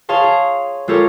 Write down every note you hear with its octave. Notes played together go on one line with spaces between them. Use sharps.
G#4 C#5 F5 A5 C6
G#4
G#3 F4 G4 A4 A#4 C#5